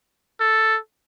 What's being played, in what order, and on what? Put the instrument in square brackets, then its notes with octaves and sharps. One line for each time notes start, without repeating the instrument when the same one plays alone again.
[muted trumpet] A4